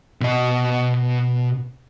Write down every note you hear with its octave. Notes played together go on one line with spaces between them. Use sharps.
B2 D#5